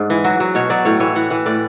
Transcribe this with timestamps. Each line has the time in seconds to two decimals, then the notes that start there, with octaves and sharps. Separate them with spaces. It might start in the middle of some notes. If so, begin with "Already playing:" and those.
Already playing: G#2 D4
0.10 E3
0.24 F#3 F#4
0.40 F#3
0.55 B2 C#5
0.70 F#3 D5
0.85 A2 C#5
1.00 E3 C#5
1.15 E3 F#5
1.30 E3 F#5
1.46 A2 D5